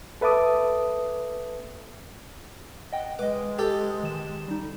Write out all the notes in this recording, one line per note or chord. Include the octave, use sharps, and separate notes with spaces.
A4 B4 E5 A5 D6 D#6
D#5 F#5 G5
G#3 B4 D#5 D6
G4 A4
D#3 E7
G3 D#4